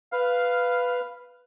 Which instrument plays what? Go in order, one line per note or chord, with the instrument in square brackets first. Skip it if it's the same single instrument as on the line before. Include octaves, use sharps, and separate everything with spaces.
[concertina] B4 F6 [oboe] F5